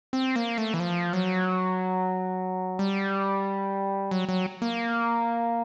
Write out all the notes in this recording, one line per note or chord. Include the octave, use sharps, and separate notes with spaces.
C4
A#3
A3
E3
F3
F#3
G3
F#3
F#3
A#3